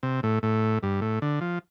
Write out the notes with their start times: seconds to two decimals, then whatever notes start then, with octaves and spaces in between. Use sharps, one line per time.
0.03 C3
0.23 A2
0.43 A2
0.83 G2
1.01 A2
1.22 D3
1.41 F3